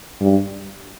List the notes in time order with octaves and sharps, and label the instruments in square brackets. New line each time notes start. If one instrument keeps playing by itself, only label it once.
[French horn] G2